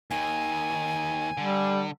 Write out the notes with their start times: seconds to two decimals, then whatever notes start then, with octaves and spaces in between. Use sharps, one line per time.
0.11 D#2 D#3 G#5
1.38 D3 G3